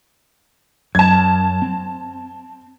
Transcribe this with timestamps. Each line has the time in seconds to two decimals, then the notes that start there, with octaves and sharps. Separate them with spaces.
0.95 F#2 A5 G#6
1.62 C4